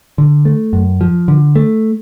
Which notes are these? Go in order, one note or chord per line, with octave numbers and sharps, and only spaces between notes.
D3
A3
F#2
F3
D3
A3